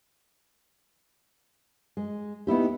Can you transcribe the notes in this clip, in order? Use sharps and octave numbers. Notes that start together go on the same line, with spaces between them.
G#3
B3 D#4 E4 G4